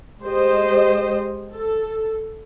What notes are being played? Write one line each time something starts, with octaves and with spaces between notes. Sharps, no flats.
G#3 G4 C5 D#5
A4